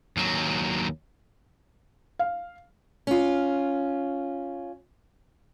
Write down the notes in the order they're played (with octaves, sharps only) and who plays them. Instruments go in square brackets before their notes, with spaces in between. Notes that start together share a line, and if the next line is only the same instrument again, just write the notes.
[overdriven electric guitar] D#2 F#3
[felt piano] F5
[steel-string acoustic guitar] C#4 F4